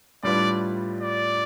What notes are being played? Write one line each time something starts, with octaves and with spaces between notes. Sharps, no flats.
A2 G3 D4 F4 B4 D5
D5